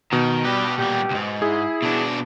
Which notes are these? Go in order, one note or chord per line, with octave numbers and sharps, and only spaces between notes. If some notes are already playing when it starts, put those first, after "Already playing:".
B2 D#3
G3 G4 B4
A#2 G3 G4
C#2 G#2
E4 G#4
B2 D4